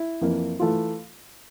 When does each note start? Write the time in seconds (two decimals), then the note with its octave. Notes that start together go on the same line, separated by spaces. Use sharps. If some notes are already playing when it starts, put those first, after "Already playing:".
Already playing: E4
0.21 F2 E3 A#3
0.59 E3 A3 F4